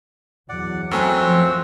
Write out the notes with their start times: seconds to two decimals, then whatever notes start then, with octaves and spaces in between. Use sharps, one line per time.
0.49 E2 F#3 D5 F#5
0.91 F#2 A3 C4 F#4 G#5 E6
1.22 F3